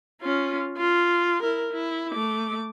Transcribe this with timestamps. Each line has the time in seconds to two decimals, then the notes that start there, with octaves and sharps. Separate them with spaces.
0.22 C#4 F4
0.78 F4
1.43 E4 A#4
1.72 E4
2.12 A3 D6